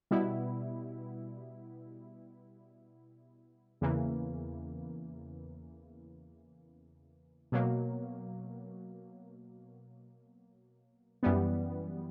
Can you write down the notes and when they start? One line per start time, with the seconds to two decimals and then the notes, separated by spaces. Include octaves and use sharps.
0.11 B2 G3 B3 E4
3.81 E2 C#3 E3 A#3
7.52 B2 F#3 A#3
11.23 F#2 E3 G3 B3